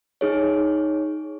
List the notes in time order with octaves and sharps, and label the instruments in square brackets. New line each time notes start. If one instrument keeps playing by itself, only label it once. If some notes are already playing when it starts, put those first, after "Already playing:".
[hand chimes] D#4 G#4 C#5